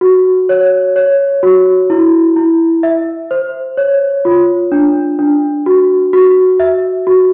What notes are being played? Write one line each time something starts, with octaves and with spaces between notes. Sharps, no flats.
F#4
C#5
C#5
F#4
E4
E4
E5
C5
C#5
F4
D4
D4
F#4
F#4
E5
F#4